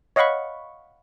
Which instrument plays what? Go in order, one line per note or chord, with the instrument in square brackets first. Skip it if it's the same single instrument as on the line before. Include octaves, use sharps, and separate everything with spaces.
[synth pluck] C#5 D#5 F5 F#5 B5 C#6